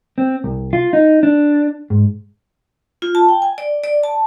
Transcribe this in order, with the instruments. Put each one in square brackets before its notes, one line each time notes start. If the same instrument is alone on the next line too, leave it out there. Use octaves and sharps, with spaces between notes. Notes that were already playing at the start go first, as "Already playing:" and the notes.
[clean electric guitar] C4
C2
F4
D#4
D4
G#2
[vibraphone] F4
A5
G5
G#5
D5
D5
A5